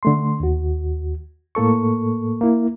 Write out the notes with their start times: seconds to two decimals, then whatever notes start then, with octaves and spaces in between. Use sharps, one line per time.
0.03 D3 A3 C6
0.40 D#2 F#4
1.55 A2 A#3 A4 C#6
2.41 A#3 E4